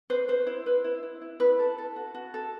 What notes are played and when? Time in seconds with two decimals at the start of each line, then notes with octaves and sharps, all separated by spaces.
0.10 B4 C5
0.28 B4 C5
0.47 E4
0.66 B4
0.84 E4
1.03 E4
1.21 E4
1.40 E4 B4
1.59 A4
1.78 A4
1.96 F#4
2.15 F#4
2.34 A4